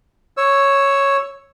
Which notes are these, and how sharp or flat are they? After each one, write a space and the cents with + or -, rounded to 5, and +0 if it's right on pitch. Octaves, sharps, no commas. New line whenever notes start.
C#5 +0 E6 +0